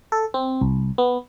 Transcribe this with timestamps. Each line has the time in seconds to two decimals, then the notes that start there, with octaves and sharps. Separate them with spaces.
0.12 A4
0.34 C4
0.61 C2
0.98 B3